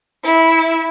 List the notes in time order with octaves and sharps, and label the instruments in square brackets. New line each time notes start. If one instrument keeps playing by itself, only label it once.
[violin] E4